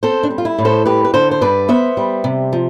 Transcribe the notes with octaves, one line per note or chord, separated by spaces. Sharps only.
C4 A4 C5
D4
G3
F4
E4
A2
A4 C5
G3 G4 B4
B4
D3 A4 C5
C5
G2 B4 D5
B3 C5 E5
G3
C3
F3